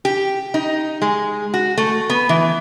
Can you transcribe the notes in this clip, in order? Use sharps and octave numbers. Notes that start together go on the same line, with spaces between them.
G4
D#4
G#3
F#4
A3
B3
E3